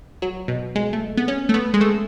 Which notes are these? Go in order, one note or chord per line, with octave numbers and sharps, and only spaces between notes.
F#3
B2
G#3
A3
B3
C#4
A3
B3
G#3
A3